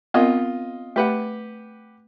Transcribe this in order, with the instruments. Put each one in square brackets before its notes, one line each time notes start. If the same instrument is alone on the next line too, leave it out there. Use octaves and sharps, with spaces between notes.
[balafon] B3 C4 A#4 [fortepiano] F4 D#5
[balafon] A3 [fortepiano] G4 B4 F#5